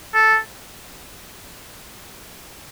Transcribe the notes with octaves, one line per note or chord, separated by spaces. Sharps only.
A4